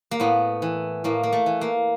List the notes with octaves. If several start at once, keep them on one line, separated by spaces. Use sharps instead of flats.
A#3
A2 B3
E3
A2 A#3
A#3
A3
E3
A#3